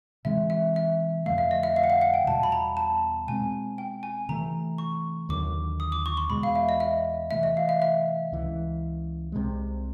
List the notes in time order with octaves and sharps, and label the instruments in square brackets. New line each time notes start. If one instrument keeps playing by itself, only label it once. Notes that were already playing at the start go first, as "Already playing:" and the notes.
[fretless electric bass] C3 E3 G#3 C4 [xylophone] E5
[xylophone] E5
E5
[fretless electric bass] F2 D3 F3 A3 [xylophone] F5
[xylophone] E5
D#5
E5
F5
F#5
F5
F#5
G5
[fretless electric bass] E2 B2 G3 [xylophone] A5
[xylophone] B5
A#5
A5
[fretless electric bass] B2 G#3 C4 [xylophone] G#5
[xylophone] G5
G#5
[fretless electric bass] C3 E3 A3 [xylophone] A#5
[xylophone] C#6
[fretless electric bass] D#2 D3 F#3 [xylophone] D6
[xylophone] D#6
D6
C#6
C6
[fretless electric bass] E2 B2 G#3 [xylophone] B5
[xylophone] F5
E5
D#5
E5
[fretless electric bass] C3 E3 A3 [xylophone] E5
[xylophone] D#5
F5
E5
E5
[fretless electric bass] C#2 C#3 E3
C2 C3 D#3 G#3